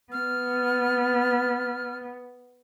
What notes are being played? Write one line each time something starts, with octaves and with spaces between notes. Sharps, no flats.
B3 F6